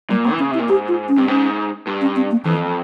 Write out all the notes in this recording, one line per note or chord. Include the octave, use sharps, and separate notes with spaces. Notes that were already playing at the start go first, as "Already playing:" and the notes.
A#2 G3
A#3
E3
C#3 C#4
C3 E4
A#2
G#2 G4
F4
C#4
G2 C4
G#2 C#4
G2
C#4
C4
A#3
F2 E3